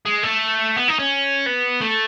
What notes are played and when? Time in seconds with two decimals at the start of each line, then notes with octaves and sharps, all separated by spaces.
0.05 G#3
0.23 A3
0.76 B3
0.88 D#4
0.99 C#4
1.46 B3
1.80 A3